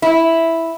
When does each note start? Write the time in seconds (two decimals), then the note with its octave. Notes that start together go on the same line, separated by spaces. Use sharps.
0.02 E4